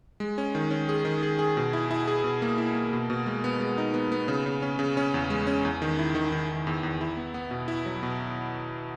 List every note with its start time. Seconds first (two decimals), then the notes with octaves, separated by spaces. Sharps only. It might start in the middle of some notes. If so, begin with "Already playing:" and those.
0.20 G#3
0.38 C#4
0.55 D#3
0.71 C#4
0.89 G#4
1.05 D#3
1.23 G#4
1.39 G#4
1.57 B2
1.73 E4
1.91 E4
2.08 G#4
2.24 B2
2.42 A#3
2.58 E4
2.75 A#3
2.93 B2
3.10 B2
3.26 G#3
3.44 B3
3.60 G#3
3.78 D#4
3.94 B3
4.12 B3
4.28 C#3
4.46 C#3
4.62 C#4
4.79 C#3
4.97 C#4
5.14 E2
5.30 G#3
5.47 C#4
5.65 E2
5.82 D#3
5.99 E4
6.15 D#3
6.32 D#3
6.49 D#3
6.67 E2
6.83 E2
7.01 E4
7.17 B3
7.34 B3
7.51 B2
7.68 E4
7.86 F#3
8.03 B2